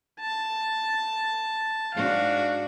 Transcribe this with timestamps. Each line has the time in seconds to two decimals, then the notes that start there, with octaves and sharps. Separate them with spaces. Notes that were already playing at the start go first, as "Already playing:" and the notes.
0.20 A5
1.94 G#2 D4 F#4 F5